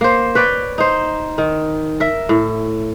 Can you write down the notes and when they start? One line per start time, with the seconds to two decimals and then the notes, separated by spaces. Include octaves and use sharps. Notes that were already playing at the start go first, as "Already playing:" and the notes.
0.01 A#3 C5
0.35 B4 C#5 D5 G5
0.78 D#4 C5
1.38 D#3
2.00 A#4 E5
2.29 A2